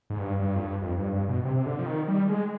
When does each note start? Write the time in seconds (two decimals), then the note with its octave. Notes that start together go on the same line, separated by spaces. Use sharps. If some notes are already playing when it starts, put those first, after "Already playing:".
0.10 G#2
0.19 G2
0.39 G2
0.55 F2
0.61 G2
0.82 F2
0.97 G2
1.13 G2
1.29 B2
1.45 C3
1.57 C3
1.66 D3
1.79 F3
1.86 D#3
2.08 G3
2.29 G#3